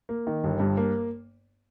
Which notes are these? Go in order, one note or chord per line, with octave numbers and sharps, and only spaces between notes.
A#3
D#3
G1
G2
A#3